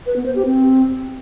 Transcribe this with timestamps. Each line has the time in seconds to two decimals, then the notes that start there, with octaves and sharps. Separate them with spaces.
0.06 B4
0.16 B3
0.26 C5
0.36 G4
0.45 C4